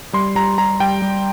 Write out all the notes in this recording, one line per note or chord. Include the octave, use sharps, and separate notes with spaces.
G3 C6
G3 A#5
G3 A#5
G3 G5
G3